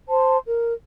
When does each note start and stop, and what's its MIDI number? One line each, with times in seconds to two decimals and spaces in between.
0.09 0.37 72
0.09 0.37 81
0.09 0.37 84
0.45 0.72 70